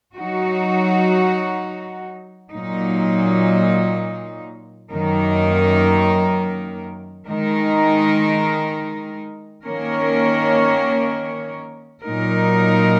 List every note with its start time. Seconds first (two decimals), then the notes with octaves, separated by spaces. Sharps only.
0.14 F#3 D#4 F#4
2.52 A#2 F#3 D#4
4.90 F#2 D#3 A#3 D#4 A#4
7.27 D#3 G#3 D#4 A#4
9.65 D#3 A#3 C#4 A#4 C#5
12.02 A#2 F#3 D#4 A#4